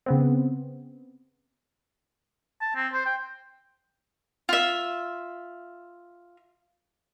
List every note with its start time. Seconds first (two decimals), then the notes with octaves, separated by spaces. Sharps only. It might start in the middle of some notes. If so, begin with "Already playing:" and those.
0.06 C#3 B3 C4
2.61 A5
2.75 C4
2.93 C5
3.06 G5
4.49 F4 E5